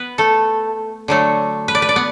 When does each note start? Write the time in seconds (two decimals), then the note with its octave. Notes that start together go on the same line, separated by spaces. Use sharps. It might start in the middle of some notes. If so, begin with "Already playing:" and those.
Already playing: B3 B4
0.18 A3 A4
1.08 D3 F#3 A3
1.68 B4
1.75 D5
1.82 B4
1.89 D5
1.96 B3